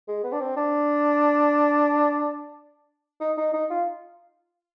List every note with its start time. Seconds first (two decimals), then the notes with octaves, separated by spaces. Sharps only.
0.08 G#3
0.24 B3
0.32 D4
0.40 C4
0.57 D4
3.21 D#4
3.38 D#4
3.53 D#4
3.70 F4